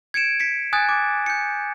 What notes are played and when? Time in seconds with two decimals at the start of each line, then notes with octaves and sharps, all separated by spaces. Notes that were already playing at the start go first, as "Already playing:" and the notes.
0.14 G#6 C#7 D7 E7
0.40 B6 C#7
0.73 G#5 D#6 F#6 G#6 A6
0.89 D6
1.26 G6 C#7